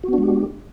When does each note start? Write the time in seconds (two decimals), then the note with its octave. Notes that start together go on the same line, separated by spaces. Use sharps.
0.03 F#4
0.08 B3
0.13 D4
0.18 G#3
0.23 G4